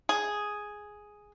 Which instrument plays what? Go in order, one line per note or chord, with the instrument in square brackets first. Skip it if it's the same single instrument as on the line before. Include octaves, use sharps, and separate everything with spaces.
[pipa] G#4